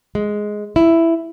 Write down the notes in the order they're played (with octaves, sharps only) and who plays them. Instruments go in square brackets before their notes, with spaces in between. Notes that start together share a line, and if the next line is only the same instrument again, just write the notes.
[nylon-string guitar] G#3
E4